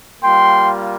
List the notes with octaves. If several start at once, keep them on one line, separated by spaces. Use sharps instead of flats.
G3 A#3 F4 G5 C6